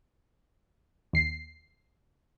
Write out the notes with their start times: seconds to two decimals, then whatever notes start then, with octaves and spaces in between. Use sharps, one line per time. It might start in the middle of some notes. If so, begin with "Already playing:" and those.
1.13 D#2 C7